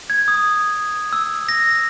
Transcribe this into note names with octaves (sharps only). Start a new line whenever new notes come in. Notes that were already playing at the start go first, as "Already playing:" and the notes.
G#6
D#6
E6
A#6